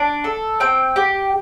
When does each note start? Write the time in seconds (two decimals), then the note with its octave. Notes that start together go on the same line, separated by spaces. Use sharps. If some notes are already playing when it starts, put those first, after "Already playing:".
Already playing: D4
0.24 A4
0.60 C4 G5
0.96 G4